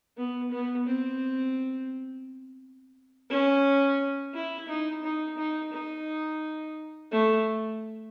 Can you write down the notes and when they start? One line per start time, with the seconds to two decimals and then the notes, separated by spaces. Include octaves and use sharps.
0.17 B3
0.51 B3
0.87 C4
3.30 C#4
4.34 E4
4.68 D#4
5.03 D#4
5.37 D#4
5.72 D#4
7.11 A3